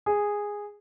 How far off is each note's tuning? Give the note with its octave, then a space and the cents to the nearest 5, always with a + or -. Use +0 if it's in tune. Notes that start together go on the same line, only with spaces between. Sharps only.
G#4 -10